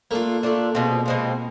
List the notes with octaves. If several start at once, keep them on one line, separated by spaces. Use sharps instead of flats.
A3 A#3 D4 F4
A3 D4 F4
B2 G#3 C4 F4
B2 G#3 C4 F4